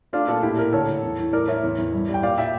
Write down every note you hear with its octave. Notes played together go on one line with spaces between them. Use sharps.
A3 D4 F4
A#2 F4 A4
A2 E4 G4
A3 G4 A#4
D3 A4 C#5
D3
E2
E3
A2 A#4 D5
A2 C#5 E5
E2
E2
G2
G3
G5
A#2 D5 F5
A#2 E5 G5